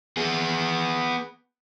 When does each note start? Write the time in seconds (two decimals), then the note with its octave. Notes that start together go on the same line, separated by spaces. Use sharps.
0.17 B3 G#4